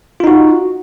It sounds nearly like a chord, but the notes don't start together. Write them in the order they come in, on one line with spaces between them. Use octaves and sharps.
F4 D#4 F#4